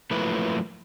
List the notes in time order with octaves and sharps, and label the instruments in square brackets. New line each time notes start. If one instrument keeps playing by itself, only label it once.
[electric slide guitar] F3 F#3 A3 A#3 E4 B4